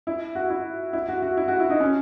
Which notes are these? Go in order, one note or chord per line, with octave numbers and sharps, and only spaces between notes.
E4
F#4
E4
E4
F#4
F#4
E4
F#4
E4
D#4
C#4